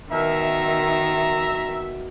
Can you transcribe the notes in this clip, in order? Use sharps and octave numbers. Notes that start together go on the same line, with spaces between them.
B2 D#3 A#4 E5 A#5